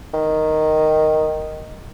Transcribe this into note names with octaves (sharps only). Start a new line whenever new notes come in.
D#3